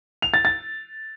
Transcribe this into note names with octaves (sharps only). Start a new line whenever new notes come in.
F7
A6
A6